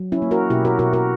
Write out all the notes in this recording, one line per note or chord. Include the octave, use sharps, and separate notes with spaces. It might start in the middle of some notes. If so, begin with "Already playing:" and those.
Already playing: F#3
C#4 E4
A#3
F#4 A#4
B2 E4 G4
F#4 A#4
B2 F#4 A#4
F#4 A#4